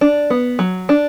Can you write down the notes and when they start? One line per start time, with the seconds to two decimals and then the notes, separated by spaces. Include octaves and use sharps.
0.01 D4
0.30 B3
0.59 F#3
0.89 D4